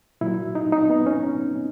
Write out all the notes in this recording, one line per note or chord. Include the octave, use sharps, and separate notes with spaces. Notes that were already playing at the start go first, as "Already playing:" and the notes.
A#2 F#3 E4
D#4
D#4
B3
C#4